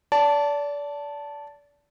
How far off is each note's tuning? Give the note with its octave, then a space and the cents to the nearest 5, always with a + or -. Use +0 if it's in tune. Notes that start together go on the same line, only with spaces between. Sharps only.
D5 -30 A5 +0